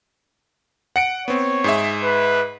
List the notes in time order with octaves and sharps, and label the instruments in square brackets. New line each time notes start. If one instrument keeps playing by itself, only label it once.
[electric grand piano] F#5 C#7 D7
[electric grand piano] B3 C4 [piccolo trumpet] C#5
[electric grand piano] G#2 G#4 E5
[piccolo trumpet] B4